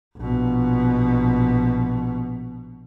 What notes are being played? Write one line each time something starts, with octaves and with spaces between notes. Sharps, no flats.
A#1 B2